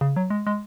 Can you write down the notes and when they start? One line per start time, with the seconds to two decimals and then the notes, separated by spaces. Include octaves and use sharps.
0.01 C#3
0.16 F#3
0.30 G#3
0.47 G#3